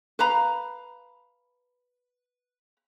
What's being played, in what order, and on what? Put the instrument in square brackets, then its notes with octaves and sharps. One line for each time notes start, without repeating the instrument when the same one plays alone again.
[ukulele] B4 F5 A#5 B5